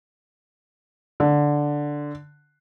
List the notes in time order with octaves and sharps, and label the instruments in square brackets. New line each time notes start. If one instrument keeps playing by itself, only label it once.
[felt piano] D3